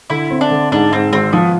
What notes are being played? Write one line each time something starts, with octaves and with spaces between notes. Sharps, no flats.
D3 E4
C4
D4
D3
G#2 D4
G#2 C4
G#1 C4
F3 B3